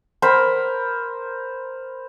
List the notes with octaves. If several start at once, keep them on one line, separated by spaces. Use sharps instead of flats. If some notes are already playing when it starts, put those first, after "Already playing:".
A#4 C5 B5